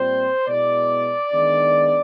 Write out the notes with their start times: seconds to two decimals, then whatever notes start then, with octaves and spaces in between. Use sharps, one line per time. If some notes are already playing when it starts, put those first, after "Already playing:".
Already playing: A#2 G3 C4 F4 C5
0.47 B2 G#3 B3 E4 D5
1.33 D#3 G#3 B3 D4